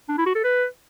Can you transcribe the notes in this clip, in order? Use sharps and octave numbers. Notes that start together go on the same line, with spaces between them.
D4
E4
F#4
A4
B4